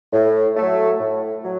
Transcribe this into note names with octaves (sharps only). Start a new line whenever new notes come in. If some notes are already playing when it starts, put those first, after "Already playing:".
A2
F#3 A3
A2
F#3